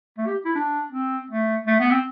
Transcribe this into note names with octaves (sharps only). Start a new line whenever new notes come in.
A3
G4
E4
D4
C4
A3
A3
B3
C4